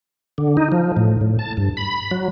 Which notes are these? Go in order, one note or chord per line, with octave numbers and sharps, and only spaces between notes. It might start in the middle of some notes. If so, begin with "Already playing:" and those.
D3
D#4
F3
A2
A2
A5
G2
B5
F#3